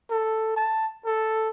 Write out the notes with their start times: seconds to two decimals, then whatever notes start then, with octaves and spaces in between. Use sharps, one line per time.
0.11 A4
0.57 A5
1.05 A4